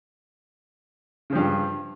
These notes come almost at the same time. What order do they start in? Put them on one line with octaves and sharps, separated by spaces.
C#3 F3 G2